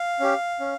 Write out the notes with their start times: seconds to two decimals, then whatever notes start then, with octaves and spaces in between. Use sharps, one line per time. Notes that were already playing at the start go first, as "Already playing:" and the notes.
Already playing: F5
0.20 C#4 G4
0.60 C#4